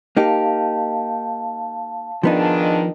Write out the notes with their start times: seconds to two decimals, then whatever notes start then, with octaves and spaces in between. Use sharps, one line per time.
0.17 A#3 D#4 G4 F5 A5
2.23 G#2 D#3 F3 B3 D4 D#4